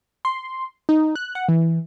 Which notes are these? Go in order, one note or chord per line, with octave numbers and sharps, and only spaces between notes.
C6
D#4
F#6
F#5
E3